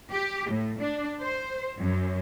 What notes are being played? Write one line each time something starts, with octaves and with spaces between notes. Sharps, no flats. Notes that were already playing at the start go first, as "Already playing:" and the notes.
G4
A2
D4
C5
F#2